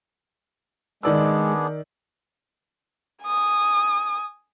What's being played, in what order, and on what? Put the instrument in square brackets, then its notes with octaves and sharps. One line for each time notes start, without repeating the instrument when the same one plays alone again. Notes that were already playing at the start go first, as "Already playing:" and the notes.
[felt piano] D#3 D5 E6 [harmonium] G#3 [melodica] B3 D4 G#4
[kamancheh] G#5 D#6